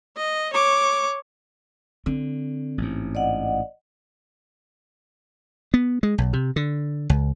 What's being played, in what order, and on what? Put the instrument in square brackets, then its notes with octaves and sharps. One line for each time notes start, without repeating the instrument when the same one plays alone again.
[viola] D#5
C#5 D6
[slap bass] D3 [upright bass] C4
[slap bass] A1 G#2
[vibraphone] D5 D#5 F#5
[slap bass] B3
G#3
B1
C3
D3
C#2